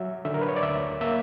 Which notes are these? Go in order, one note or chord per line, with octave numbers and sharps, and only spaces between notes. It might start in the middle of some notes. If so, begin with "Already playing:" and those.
Already playing: F#3 E5
D3 E5
A#4
B4
C#5
D5
D2 E5
A#3 E5